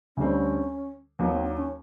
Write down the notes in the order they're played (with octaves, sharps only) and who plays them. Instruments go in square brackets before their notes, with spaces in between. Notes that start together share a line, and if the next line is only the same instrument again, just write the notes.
[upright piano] D2 D3 G3 C4 [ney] C#4
[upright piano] D#2 D#3 F#3 [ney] B3
[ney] C4
D4
C#4